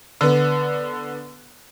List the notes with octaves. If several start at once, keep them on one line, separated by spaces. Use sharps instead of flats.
D3 B3